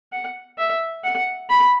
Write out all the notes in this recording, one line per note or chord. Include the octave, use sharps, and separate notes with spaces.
F#5
E5
F#5
B5